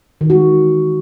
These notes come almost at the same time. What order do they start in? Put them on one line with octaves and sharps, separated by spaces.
D#3 E3 F#4 G#3